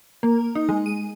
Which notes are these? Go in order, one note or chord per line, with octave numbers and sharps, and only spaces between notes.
A#3
D#4
G#3
D#7